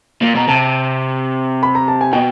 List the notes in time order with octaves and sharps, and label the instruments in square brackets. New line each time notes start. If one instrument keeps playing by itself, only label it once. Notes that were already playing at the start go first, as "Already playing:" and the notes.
[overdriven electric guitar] A#2
[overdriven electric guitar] B2 [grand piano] A#5
[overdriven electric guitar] C3 [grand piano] A5
[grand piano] B5
A#5
A5
G#5
[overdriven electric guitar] B2 [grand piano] G5